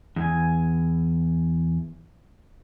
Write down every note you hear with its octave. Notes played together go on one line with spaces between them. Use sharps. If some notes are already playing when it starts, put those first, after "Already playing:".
E2 G#5